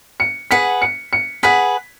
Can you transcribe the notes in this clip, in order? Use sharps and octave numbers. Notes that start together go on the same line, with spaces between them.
C#7
G#4 B4 F#5 B6
C#7
C#7
G#4 B4 F#5 B6